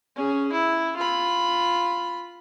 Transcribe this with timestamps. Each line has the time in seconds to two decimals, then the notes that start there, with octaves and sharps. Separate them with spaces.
0.16 C#4 G#4
0.52 E4
0.96 F4 B5